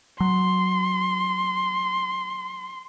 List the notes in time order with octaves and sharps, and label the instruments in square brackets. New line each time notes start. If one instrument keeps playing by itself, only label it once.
[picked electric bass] F#3 [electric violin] C6